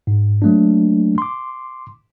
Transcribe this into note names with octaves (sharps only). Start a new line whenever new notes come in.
G#2
F#3 A3 A#3 D4
C6 D6